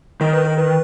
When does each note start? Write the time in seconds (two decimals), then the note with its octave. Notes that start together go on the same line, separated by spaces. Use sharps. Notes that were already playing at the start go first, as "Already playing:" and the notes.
0.21 D#3 A#4
0.33 B4
0.45 A#4
0.58 B4